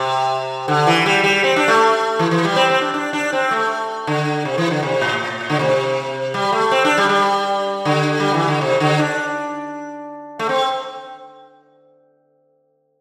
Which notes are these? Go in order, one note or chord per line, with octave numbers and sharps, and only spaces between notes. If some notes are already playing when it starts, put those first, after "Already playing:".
Already playing: C3
D3
E3
G3
G3
C4
D4
A3
E3
E3
G3
C4
C4
D4
D4
D4
C4
A3
D3
C3
E3
D3
C3
A2
D3
C3
G3
A3
C4
D4
G3
G3
D3
G3
E3
D3
C3
D3
D4
A3
C4